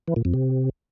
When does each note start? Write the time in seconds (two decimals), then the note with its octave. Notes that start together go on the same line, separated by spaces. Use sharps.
0.08 E3
0.16 A#2
0.25 F2
0.34 C3